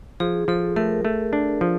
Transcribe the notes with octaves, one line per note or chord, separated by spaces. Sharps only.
F3 G#4
F3 A4
A3 A#4
A3
D4
F3